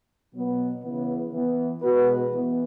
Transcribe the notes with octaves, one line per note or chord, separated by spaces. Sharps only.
B2 F#3 B3
C#3 E3 B3
E3 B3
B2 G#3 B3 F#4 B4
E3 B3